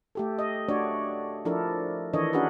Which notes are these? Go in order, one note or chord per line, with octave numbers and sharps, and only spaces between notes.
A3 G4 A4
D#5
A3 D4 F#4 C#5 D5
F3 D4 E4 A4 A#4
D#3 E3 D4 A4 C#5 D#5
C#4 D4 F#4 G#4 A#4 B4